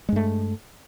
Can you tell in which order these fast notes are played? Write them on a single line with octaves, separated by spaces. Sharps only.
G#3 G2 A3